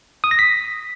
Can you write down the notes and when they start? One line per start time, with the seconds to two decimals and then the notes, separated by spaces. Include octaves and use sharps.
0.24 D#6
0.31 A#6
0.39 B6